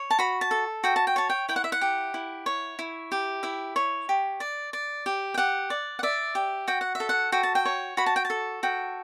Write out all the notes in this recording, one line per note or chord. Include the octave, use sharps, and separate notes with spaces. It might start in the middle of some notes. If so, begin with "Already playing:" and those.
Already playing: C#5
A5
F#4 B5
A5
A4
F#4 G5
A5
G5
C#5 A5
G5
E4 G5
F#5
E5
F#5
G4
E4
C#5
E4
G4
E4 E5
C#5
G4
D5
D5
G4
G5
G4 F#5
D5
F#5
D5 E5
G4
F#4 G5
F#5
E5
A4
F#5
F#4 G5
A5
G5
C#5
F#4 B5
A5
G5
A5
A4
F#4 G5